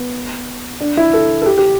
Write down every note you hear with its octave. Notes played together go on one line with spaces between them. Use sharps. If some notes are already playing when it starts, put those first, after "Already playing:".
Already playing: B3
D4
E4
A4
A4
G4
G4